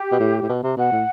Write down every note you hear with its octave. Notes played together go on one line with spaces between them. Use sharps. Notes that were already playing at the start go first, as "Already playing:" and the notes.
Already playing: G4
B2
A2
A2
B2
C3
B2 F#5
A2